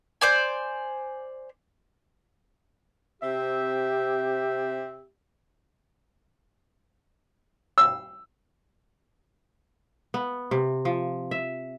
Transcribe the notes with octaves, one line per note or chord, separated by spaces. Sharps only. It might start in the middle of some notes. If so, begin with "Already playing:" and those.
C5 D5 G#5
C3 C4 G4 E5
E6
B3
C3
F3
E5